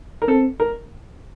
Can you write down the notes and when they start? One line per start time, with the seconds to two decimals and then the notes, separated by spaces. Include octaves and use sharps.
0.22 A#4
0.28 C4 A4
0.60 A#4